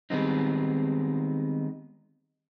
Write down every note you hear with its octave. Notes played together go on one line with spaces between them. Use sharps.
D#3 G3 G#3 B3 C4 D#4